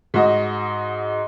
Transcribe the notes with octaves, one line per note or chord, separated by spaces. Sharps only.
G#2 F#4 D#5